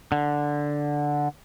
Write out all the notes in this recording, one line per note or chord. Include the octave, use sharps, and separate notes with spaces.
D3